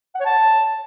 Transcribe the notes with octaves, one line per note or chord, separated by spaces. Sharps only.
F#5
C#5
A5